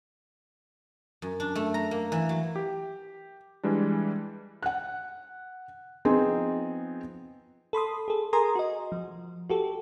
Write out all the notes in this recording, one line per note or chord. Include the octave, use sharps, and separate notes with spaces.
F#2
D4
A3
A#5
A#3
E3
F#3
G4
E3 G3 G#3 D4
F#5 F#6
F3 B3 C4 D#4 G#4
A4 B5 C6 D#6
G#4 A4
G#4 A#4 G#5 A#5 C6 D#6
F#4 D#5
F3
F#4 G4 A4